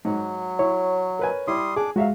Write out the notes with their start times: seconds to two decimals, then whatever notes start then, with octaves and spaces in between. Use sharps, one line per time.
0.05 G#2 F#3
0.59 E4 C#5
1.19 A#4 B4 G#5
1.48 G3 E4 C6 D#6
1.76 D4 G#4 D6
1.96 F#3 G#3 F#4 E5 F5